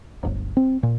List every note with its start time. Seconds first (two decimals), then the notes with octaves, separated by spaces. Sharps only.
0.23 D1 G1
0.57 C4
0.83 A#2